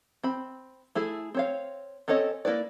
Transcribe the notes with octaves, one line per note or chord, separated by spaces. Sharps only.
C4 B5
A3 E4 G#4
C4 C#5 F5
C4 C#4 A4 C#5 D#5
A#3 C#4 E4 B4 D5